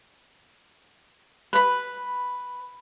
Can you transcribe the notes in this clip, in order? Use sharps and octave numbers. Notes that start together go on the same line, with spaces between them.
B4 B5